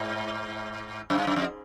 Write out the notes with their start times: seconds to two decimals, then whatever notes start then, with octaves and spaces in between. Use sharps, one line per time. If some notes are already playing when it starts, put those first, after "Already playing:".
Already playing: G#2
1.10 F#2
1.18 G2
1.27 F#2
1.36 F2